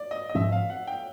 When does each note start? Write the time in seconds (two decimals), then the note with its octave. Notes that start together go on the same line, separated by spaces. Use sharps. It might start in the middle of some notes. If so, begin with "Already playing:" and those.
Already playing: D5
0.11 D#5
0.29 D#5
0.35 G#2 F3 A3 C4 E5
0.52 F5
0.70 F#5
0.87 G5